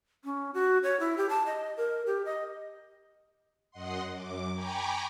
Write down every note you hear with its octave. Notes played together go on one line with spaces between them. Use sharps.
C#4
F#4
C#5
E4
G4
A5
D#5
A#4
G4
D#5
F#2 D#5 F#5 C6
F#2 D6
G5 G#5 A#5 B5 C#6 D6